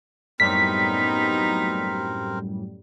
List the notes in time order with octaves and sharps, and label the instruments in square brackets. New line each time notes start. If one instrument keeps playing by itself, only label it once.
[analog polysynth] F#2 A2 G3 [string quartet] B3 D#4 [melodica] C4 A#4 [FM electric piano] B6